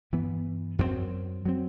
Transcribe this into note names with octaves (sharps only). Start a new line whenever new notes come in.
G2 E3 B3
F#2 F#3 A3 C4
F#3 A3 C4